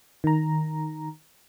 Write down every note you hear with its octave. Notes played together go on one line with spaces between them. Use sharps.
D#3 A#5